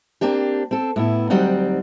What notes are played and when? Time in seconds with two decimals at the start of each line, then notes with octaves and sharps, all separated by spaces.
0.21 A#3 C4 D4 G4
0.71 C4 A4
0.96 A2 B3 E4
1.30 D2 F#3 G3 C4 D#4 F#5